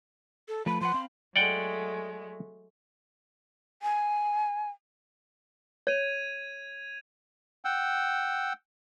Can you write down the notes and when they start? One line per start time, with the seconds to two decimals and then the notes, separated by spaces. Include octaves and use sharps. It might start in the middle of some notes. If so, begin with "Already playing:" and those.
0.48 A4
0.66 F3 A3 B4 B5
0.81 F3 B4 F#5 C6
0.94 C4 F5 B5
1.36 F#3 G#3 A3 D5 F#5 G5
3.82 G#5
5.87 C#5 G#6 D#7 F7
7.65 F#5 G5 E6